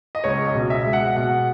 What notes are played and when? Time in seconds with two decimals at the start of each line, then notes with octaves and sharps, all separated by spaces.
0.15 D#5
0.24 C#2 C#5
0.47 D#5
0.54 B2
0.70 E5
0.85 G#3
0.93 F#5
1.16 B2 F#5